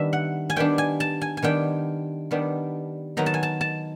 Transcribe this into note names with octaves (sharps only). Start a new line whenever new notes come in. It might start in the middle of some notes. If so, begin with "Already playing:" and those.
Already playing: D#3 G3 B3 D4 E5
F#5
G#5
D#3 G3 B3 D4 G5
G#5
A5
G#5
G#5
D#3 G3 B3 D4 G5
D#3 G3 B3 D4
D#3 F#3 B3 D#4 A#5
A5
G#5
A5
A5